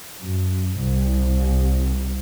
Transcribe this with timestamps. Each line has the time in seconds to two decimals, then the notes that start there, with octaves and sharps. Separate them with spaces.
0.21 F#2
0.79 C2